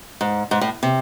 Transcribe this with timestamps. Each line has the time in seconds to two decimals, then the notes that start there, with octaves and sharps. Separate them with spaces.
0.21 G#2
0.51 G#2
0.61 A2
0.83 C3